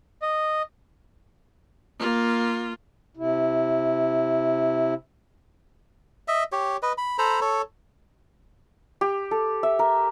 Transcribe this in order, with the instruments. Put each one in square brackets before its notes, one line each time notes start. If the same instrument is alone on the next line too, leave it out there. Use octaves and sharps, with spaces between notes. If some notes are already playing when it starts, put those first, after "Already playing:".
[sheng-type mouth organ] D#5
[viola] A#3 F4
[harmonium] C3 E4
[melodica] D#5 E5
G4 C#5
B4 D#5
B5
A4 C5 A#5 B5
A4 C#5
[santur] G4
A4
E5
A#4